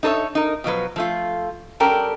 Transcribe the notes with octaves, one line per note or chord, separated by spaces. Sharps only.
D#4 A4 C5 C#5 E5
D#4 A#4
B2 F3 F#3 B4
F3 A3 F4
G3 C#4 A4 A#4 D5 G5